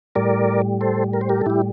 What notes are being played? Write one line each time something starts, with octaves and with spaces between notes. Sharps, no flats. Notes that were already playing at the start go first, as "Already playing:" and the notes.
A2 G3 A#4 D5
A4 C5
A#4
C5
G4 A#4
A4
A2 G3 E4 G4